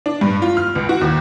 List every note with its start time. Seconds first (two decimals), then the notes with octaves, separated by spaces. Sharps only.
0.06 D4
0.21 G2
0.42 F4
0.57 F6
0.75 C#2
0.89 F#4
1.01 D#2